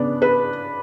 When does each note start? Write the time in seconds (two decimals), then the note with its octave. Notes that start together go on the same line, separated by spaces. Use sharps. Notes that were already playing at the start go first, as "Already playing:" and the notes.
Already playing: C#3 B3 D4 D5
0.22 B4